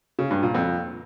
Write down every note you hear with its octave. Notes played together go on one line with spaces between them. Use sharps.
C#3
G2
A#2
F2